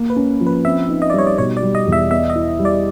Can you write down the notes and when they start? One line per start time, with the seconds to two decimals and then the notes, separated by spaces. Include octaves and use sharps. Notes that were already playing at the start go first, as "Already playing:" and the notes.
Already playing: A#3
0.10 B4
0.16 C#4
0.40 F3
0.47 B4
0.65 C4 E5
0.89 D#4
1.02 D#5
1.10 G3 D5
1.18 C#5
1.27 D5
1.38 B2 C#5
1.57 D5
1.62 G3
1.75 D#5
1.87 E2
1.92 E5
2.11 B3 E5
2.30 D#5
2.35 E4
2.59 G3
2.65 D5